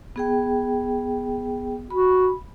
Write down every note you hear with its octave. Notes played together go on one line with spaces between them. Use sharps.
B3 G#4 G5
F#4 B5